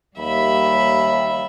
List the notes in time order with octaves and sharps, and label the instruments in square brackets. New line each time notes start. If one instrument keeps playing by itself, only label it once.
[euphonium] D#2 [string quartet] G3 E5 B5